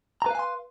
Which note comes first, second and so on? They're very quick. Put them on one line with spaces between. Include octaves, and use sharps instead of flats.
A#5 B4 F5 G#5 C6